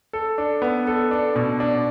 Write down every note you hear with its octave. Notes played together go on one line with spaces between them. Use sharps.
A4
D4
B3
A4
D4
B2
D4